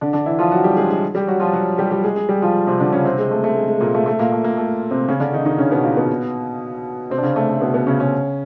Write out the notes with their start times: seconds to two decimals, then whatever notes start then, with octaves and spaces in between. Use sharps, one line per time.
0.01 D3 D4
0.13 D3 D4
0.26 E3 E4
0.39 F3 F4
0.52 F#3 F#4
0.64 G3 G4
0.77 G#3 G#4
0.90 G#3 G#4
1.15 G3 G4
1.27 F#3 F#4
1.40 F3 F4
1.53 F#3 F#4
1.78 G3 G4
1.91 G3 G4
2.04 G#3 G#4
2.16 G#3 G#4
2.29 G3 G4
2.42 F3 F4
2.67 C3 C4
2.80 D3 D4
2.93 C#3 C#4
3.05 C3 C4
3.18 G#3
3.31 A3
3.44 A3
3.56 G#3
3.68 G#3
3.81 A#2 A#3
3.94 A3
4.06 A3
4.19 A#2 A#3
4.32 A3
4.44 A#2 A#3
4.57 A3
4.90 C3 C4
5.08 C#3 C#4
5.20 D3 D4
5.33 D#3 D#4
5.45 D#3 D#4
5.58 C#3 C#4
5.71 B2 B3
5.83 A#2 A#3
5.97 B2 B3
7.10 C3 C4
7.18 D4
7.23 C#3 C#4
7.36 A3
7.49 A3
7.61 B2 B3
7.74 B2 B3
7.87 C#3 C#4
7.99 C#3 C#4